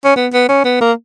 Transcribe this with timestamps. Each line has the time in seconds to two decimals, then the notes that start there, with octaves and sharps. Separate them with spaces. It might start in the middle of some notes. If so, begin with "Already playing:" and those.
0.05 C#4
0.16 B3
0.33 B3
0.49 C#4
0.65 B3
0.81 A#3